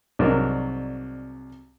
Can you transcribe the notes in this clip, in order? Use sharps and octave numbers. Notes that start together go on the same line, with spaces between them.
C2 G#2 F#3 D4 A#4 D5